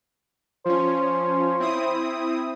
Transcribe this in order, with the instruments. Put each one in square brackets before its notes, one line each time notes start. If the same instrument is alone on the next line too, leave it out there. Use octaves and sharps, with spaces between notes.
[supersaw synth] F3 C#4 [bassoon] C5
[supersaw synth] C4 E4 D#6